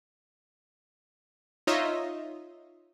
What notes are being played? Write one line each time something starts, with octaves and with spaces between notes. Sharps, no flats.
D#4 F4 C#5 D#5 E5